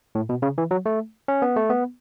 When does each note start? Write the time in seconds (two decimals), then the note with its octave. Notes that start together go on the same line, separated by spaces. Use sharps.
0.15 A2
0.29 B2
0.42 C#3
0.58 E3
0.71 F#3
0.86 A3
1.28 C#4
1.42 B3
1.56 A3
1.70 B3